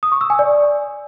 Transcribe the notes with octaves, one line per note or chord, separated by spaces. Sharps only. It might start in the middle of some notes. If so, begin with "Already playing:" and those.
D#6
C#6
E6
G#5
D5